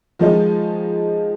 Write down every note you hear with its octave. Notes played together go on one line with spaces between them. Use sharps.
D#3 F3 G#3 D#4